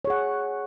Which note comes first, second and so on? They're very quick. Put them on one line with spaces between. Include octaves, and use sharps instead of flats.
C#5 G#4 F#5